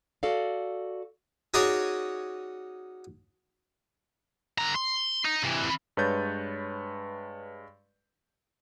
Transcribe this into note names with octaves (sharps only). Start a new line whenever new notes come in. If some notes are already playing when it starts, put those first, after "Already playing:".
F#4 A4 D5 F5
C#4 D#4 F#4 G#4 C#5 D5
D3 A#5
C6
D#4
C3 E3
G2 G#3 B4 C#5 G6 A6